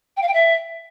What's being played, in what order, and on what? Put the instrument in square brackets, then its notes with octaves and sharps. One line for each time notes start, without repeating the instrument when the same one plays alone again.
[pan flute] G5
F5
G5
E5